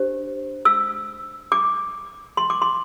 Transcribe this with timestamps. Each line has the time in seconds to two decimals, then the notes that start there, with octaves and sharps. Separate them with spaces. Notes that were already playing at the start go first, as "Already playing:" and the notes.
Already playing: D4 G4 C5
0.65 E6
1.52 D6
2.37 C6
2.50 D6
2.62 C6